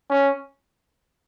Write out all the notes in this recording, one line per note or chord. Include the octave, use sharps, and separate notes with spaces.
C#4